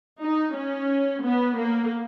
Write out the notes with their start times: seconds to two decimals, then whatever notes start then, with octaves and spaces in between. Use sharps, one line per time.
0.20 D#4
0.54 C#4
1.23 B3
1.56 A#3